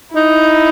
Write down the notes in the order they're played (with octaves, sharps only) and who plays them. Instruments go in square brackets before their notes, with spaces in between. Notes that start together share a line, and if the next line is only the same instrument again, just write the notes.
[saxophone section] D#4 [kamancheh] E4